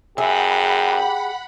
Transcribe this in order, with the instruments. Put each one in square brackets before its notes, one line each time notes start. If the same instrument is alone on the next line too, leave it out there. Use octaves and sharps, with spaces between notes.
[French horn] F#2 [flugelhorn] G4 [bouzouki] G#4 E5 [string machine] F#5 B5